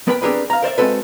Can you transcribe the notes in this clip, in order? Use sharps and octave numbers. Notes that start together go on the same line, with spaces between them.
B3 A#4 B4 G5 B5
C4 D4 G4 G#4 A#4 B4
F5 A#5
A#4 C5 D5 E5
G#3 C4 F#4 A4 B4